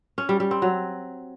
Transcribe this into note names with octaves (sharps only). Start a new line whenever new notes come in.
C#4
G3
G3
C4
F#3